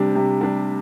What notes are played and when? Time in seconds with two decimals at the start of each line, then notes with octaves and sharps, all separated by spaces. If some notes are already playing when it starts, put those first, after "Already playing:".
Already playing: C3 G3 D4
0.15 C3
0.41 G3 D4